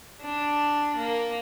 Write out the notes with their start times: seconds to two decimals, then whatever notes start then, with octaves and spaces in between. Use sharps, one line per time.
0.21 D4
0.96 A#3